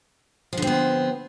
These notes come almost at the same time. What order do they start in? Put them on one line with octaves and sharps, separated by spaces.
F3 D3 C4 B3